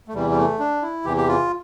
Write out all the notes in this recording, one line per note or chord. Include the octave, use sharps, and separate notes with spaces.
A3
E2 C3 E3 G3
G3
A3
D4
E4
E2 C3 E3 G4
G4
F4